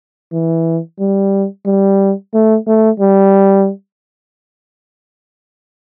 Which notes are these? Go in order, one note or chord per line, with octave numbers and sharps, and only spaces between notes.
E3
G3
G3
A3
A3
G3